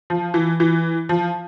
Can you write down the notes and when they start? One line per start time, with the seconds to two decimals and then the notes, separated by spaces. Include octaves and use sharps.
0.10 F3
0.34 E3
0.60 E3
1.09 F3